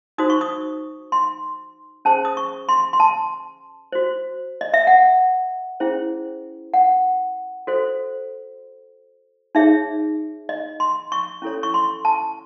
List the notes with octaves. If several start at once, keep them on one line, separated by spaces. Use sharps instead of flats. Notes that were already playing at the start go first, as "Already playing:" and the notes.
D#4 F#4 C5 D#6
C#6
D#6
C6
C#4 G#4 C5 A5
D#6
C#6
C6
C6
A5
F#4 C5
D#5
E5
F#5
C#4 E4 G#4 C5
F#5
F#4 A4 C5
D#4 G#4 C#5 E5
D#5
C6
C#6
C#4 E4 A4 C#5
C#6
C6
A5